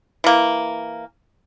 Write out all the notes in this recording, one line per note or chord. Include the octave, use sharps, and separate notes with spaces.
E3 A#3